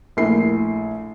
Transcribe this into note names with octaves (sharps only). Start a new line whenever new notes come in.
A#1 A3 E4 A#4 C7